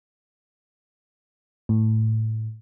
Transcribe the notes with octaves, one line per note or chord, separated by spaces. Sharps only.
A2